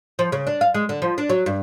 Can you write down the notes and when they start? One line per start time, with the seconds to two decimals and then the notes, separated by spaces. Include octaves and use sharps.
0.19 F3
0.32 C#3
0.47 D4
0.61 F5
0.74 G#3
0.89 D3
1.02 F3
1.18 D4
1.30 F#3
1.46 G2